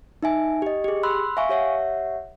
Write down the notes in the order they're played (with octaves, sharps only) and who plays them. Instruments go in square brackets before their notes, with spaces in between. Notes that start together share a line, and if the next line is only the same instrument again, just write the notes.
[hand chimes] D#4 E5 G#5
G4 D#5
G4 G#4
B5 C6 E6 F#6
E5 F5 G#5 C#6
G4 C#5 E5 F#5